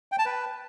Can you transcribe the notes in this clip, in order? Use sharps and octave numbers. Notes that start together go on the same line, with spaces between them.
G5
A5
B4